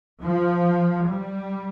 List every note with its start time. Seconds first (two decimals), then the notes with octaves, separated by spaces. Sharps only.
0.24 F3
1.08 G3